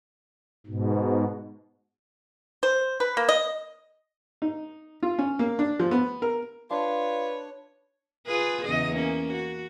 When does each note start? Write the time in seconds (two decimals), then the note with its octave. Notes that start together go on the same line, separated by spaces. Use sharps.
0.67 G#2 B2
2.63 C5
3.00 B4
3.17 A#3
3.29 D#5
4.42 D#4
5.03 F4
5.19 C#4
5.39 A#3
5.59 D4
5.80 F3
5.91 B3
6.22 A#4
6.70 D4 F4 B4 C#5
8.27 F4 G#4 B4
8.65 E2 C#3 D#5
8.94 A#3 C#4
9.33 F#4